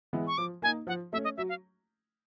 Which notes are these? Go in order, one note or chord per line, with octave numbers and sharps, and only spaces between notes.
E3 G#3 B3 E4
C#6
F3 D6
A#3 D#4 G#5
F3 F#5
A3 C#4 E5
D#5
F#3 E5
F5